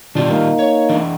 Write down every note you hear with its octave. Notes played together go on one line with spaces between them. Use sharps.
B2 D#3 D4 F4 G4
A#3 D#4
C#5
E3 D4